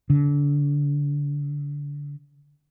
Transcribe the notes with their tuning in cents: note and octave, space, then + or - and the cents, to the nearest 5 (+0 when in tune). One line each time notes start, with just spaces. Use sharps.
D3 -25